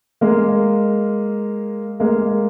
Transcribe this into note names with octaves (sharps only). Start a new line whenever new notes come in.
G#3 A#3
G#3 A#3